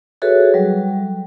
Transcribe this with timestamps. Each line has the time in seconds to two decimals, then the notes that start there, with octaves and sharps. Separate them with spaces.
0.22 F#4 G#4 A4 B4 C#5 E5
0.54 F#3 G3